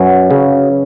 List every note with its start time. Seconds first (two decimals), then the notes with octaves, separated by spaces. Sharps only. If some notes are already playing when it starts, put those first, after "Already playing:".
Already playing: F#2 F#3 B4
0.31 C#3